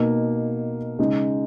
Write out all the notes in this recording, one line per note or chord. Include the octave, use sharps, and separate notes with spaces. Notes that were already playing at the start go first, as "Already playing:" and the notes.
Already playing: B2 A#3 D#4
C#3 G#3 D#4